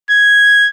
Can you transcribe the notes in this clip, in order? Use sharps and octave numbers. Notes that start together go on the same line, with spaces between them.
G#6